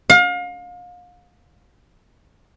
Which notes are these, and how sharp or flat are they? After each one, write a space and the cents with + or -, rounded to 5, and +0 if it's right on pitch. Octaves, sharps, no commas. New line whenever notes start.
F5 +35